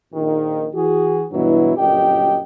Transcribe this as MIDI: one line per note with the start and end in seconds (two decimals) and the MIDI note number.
0.14 0.66 34
0.14 0.66 51
0.74 1.25 52
0.74 1.25 66
0.74 1.25 68
1.32 1.76 43
1.32 1.76 47
1.32 1.76 52
1.32 1.76 54
1.32 1.76 64
1.77 2.40 31
1.77 2.40 42
1.77 2.40 46
1.77 2.40 67
1.77 2.40 75
1.77 2.40 79